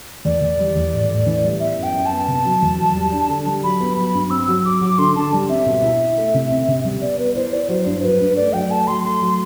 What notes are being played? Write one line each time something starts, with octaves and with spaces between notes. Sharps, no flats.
E2 D5
E2
G3
E2
A2
A2
E3
G3
B3 E5
F#2
G5
F#2
A5
B3
C3
F#3
E2
F#3
G3
D4
D3
G3
F#3 B5
B3
F#3 B5
G2
C4 E6
F#3
F#3 D6
F#3
D3 C6
D3 A5
G3
C4 E5
B2
E4
E4
A3
C3
C4
C3
G3
B3 D5
B3 B4
E4 C5
E4 D5
F#3 C5
G2
F#3 B4
G2
A3 D5
F#3 G5
A3 A5
F#3 C6
A3 C6
F#3